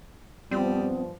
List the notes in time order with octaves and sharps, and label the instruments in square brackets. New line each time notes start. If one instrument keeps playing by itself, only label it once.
[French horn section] G2 F3 [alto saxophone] G3 [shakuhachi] B3 [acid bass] C4